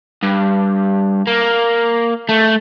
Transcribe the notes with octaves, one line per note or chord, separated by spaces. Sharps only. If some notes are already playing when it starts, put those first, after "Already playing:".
G2
A#3
A3